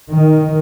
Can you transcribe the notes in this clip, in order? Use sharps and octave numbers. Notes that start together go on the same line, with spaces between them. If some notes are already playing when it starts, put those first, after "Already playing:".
D#3